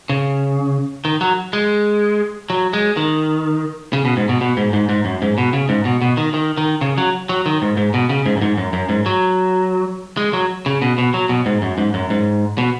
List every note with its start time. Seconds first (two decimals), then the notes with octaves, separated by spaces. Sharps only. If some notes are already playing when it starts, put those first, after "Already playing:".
0.09 C#3
1.05 D#3
1.21 F#3
1.53 G#3
2.50 F#3
2.73 G#3
2.97 D#3
3.93 C#3
4.05 B2
4.17 G#2
4.29 B2
4.41 B2
4.57 G#2
4.73 G#2
4.89 G#2
5.05 F#2
5.22 G#2
5.38 B2
5.53 C#3
5.69 G#2
5.85 B2
6.01 B2
6.17 D#3
6.34 D#3
6.57 D#3
6.81 C#3
6.98 F#3
7.29 F#3
7.46 D#3
7.62 G#2
7.77 G#2
7.94 B2
8.09 C#3
8.26 G#2
8.37 F#2
8.42 G#2
8.57 F#2
8.73 F#2
8.89 G#2
9.06 F#3
10.17 G#3
10.33 F#3
10.66 C#3
10.82 B2
10.98 B2
11.14 F#3
11.29 B2
11.46 G#2
11.62 F#2
11.78 G#2
11.94 F#2
12.10 G#2
12.58 B2